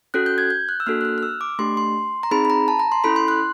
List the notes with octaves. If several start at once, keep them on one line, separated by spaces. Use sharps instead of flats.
C#4 F#4 A4 F#6
G6
G#6
G6
F#6
E6
A#3 D4 F#4 A4 F6
F#6
F6
F6
E6
D6
A3 D4 G4 C6
C6
A#5
C4 D#4 G#4 B5
B5
A#5
A5
A#5
C6
C#4 E4 A4 B5
C6
F#6